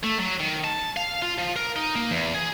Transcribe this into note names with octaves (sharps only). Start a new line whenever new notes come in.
A3
F#3
D#3
A5
F5
F4
F3
A#4
D#4
A#3
E2
G#4